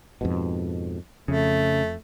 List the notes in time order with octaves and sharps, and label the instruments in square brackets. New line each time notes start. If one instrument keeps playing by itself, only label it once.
[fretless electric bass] F2 G#2 B2
[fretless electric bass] F2 [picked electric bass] C#3 [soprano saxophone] A3